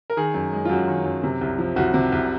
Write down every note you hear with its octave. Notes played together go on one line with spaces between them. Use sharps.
A#4
D#3 G#4
F#2
G#3
F4
F#2 F#4
D#3
F#2
C3
C2
F3
C2 F#4
C3
C2